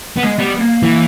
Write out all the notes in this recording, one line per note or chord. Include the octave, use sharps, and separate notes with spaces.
B3
G#3
G3 B3
A#3
E3